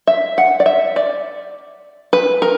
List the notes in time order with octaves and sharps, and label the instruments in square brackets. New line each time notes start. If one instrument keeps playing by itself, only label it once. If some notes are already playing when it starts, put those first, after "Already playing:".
[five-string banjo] E5
F#5
D5
E5
D5
B4
A#4